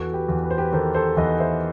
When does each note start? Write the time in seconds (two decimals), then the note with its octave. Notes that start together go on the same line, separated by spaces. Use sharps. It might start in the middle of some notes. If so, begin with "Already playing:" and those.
Already playing: E2 F#4 A4
0.13 G4 B4
0.28 E2
0.44 B4
0.51 C5
0.58 G4 B4
0.72 D#3 A4 C5
0.95 A4 C5
1.17 E2 B4 D#5
1.39 C5 E5